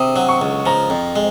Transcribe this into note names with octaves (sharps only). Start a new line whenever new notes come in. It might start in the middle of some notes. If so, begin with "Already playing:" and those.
Already playing: C3 D#6
F#3
C#6
C#2
F3 A#5
F2
G#3